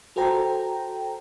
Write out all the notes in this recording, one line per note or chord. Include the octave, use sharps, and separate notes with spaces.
F#4 A4 C5 G5 A#5